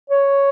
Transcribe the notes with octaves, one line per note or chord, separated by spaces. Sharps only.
C#5